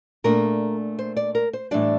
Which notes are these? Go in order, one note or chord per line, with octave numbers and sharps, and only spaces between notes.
A#2 A3 D4 A#4
C5
D5
A#4
C5
A2 E3 G3 D4 D5